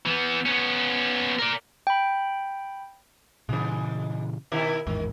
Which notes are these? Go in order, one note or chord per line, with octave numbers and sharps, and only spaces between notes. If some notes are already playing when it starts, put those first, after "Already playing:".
E3 B3
B3 C#4
A#4 D5
G5 B5
G2 A#2 C#3 E3 G#3
B2 D#3 E4
A1 E2 G#2 D#3